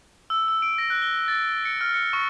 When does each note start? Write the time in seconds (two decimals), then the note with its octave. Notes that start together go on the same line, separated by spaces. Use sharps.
0.30 E6
0.48 E6
0.62 D7
0.78 A#6
0.90 F#6
1.02 G7
1.28 A6
1.65 C#7
1.81 F6
1.94 C#7
2.13 C#6